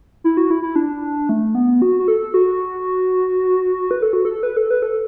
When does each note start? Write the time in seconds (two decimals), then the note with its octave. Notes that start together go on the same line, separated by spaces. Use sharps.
0.24 E4
0.37 F#4
0.50 E4
0.63 E4
0.76 D4
1.29 A3
1.55 B3
1.82 F#4
1.99 F#4
2.08 A4
2.34 F#4
3.91 B4
4.02 A4
4.13 F#4
4.25 A4
4.43 B4
4.57 A4
4.71 B4
4.82 A4